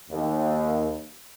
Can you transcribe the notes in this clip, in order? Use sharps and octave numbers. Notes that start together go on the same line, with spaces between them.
D#2